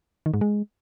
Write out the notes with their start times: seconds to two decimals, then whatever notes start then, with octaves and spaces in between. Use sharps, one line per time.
0.26 D#3
0.34 G#2
0.41 G#3